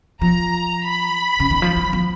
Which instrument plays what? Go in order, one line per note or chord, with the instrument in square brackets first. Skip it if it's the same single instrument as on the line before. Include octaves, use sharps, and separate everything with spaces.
[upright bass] F3 [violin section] A#5
[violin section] B5
[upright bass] C#3
D#3
F3
F#3
F3